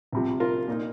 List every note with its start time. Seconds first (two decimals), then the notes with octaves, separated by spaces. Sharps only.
0.12 C2 C3 F3
0.40 F4 A#4
0.68 A#2 A#3 D#4